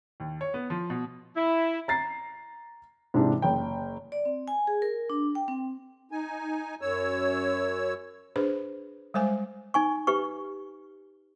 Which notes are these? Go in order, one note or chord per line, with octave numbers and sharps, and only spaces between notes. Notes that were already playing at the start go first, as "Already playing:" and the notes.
D#2
C#5
B3
F3
B2
E4
A#5 A6 C7
G#2 C3 E3 D4 G4
F#1 G5
D5
C4
G#5
G#4
A#4
D4
G5
C4
D#4 G#5
F#2 C#5 E6
D4 G#4 B4 C5
G3 G#3 C5 G#5
D#4 G#5 C#6
G4 B4 C#6